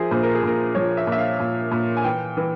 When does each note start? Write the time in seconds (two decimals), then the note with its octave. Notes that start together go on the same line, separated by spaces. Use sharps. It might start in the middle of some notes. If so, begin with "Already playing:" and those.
Already playing: F3 G#4 A#4 C5 E5
0.11 A#2 C5
0.23 A#4
0.35 G#4
0.43 A#2 A#4
0.75 F3 C#5
0.97 E5
1.07 A#2
1.12 E5
1.18 F5
1.40 A#2
1.71 A#2
1.97 G#5
2.04 E3 G5
2.37 E3